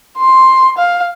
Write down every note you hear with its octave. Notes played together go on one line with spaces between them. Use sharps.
C6
F5